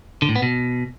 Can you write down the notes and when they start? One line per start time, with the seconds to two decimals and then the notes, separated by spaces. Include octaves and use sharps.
0.22 D3
0.29 A2
0.36 B3
0.42 B2